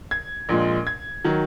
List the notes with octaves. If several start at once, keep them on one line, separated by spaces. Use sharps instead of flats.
G#6
A#1 A#2 G#3
G#6
D#3 F#3